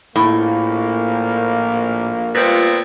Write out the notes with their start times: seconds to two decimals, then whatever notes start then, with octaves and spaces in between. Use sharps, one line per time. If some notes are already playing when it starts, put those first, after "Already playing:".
0.16 A#1 A2 A#3
2.35 A#2 G3 A3 B3 C4 F4